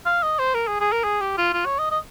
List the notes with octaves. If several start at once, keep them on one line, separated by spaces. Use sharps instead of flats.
F5
D#5
C5
A#4
G#4
G#4
A#4
G#4
G4
F4
F4
C#5
D#5
D#5